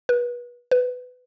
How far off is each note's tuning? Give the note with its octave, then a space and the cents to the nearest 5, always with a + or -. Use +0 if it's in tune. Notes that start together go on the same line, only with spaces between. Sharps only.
B4 -30
B4 +15